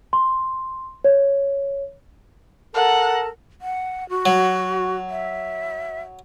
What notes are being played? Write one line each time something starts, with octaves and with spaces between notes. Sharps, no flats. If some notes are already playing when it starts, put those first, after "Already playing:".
C6
C#5
A4 A#4 F#5 A5
F#5
F#4
F#3
E5